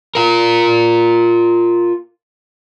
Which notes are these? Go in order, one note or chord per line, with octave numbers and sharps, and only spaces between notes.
F4 A#4